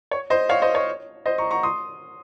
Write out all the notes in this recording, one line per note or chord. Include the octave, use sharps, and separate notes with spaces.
C#5
C5 D#5
C#5 F5
C5 D#5
C#5
C5 D#5
A#5 C#6
A#5 C#6
C6 D#6